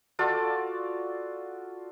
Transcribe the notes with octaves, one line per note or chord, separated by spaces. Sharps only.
F4 F#4 A4 D5